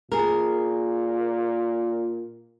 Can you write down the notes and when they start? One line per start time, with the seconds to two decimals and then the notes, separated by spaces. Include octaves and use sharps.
0.12 A#2 G#4 A#4